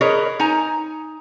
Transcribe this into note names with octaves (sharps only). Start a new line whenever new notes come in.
G#4 A#4 B4 C#5 D#5
D#4 G#5 A#5